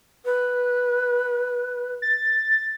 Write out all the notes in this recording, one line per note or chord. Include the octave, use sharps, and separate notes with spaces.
B4
A6